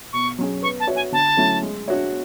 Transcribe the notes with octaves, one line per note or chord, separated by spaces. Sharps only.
B2 C#6
F#3 C#4 G#4
B3 C#6
A5
F#4 C#5 E5
G#5
D3 A5
F#3 A3 C#4 E4
G#3
D4 F#4 C#5 E5